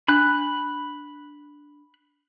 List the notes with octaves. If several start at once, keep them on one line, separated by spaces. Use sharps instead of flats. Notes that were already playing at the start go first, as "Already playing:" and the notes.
D4 B5 F#6